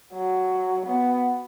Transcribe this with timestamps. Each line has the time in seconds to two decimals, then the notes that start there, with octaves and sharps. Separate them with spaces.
0.13 F#3
0.86 B3